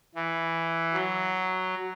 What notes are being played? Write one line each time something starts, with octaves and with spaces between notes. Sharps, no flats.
E3
F#3